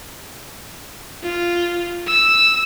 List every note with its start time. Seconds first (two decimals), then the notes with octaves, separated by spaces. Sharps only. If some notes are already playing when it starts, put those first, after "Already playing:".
1.23 F4
2.07 E6